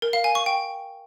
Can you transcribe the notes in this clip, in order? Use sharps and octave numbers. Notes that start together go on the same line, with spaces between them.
A#4
F5
G#5
C#6
G5